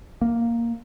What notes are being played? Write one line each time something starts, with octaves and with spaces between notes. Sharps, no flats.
A#3